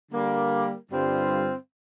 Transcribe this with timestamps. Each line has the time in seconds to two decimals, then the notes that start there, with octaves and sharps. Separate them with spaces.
0.10 D3 G3 A#3
0.91 G2 D3 G3 C4 F4